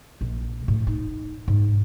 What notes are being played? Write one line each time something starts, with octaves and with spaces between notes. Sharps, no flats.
A#1
A2
D#4
G#2